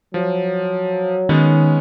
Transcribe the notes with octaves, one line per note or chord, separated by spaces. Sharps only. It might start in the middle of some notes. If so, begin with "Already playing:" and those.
F3 F#3
D#3 G#3 B3 C#4 D#4